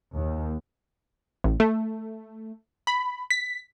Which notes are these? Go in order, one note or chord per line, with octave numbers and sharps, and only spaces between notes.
D#2
A1
A3
B5
B6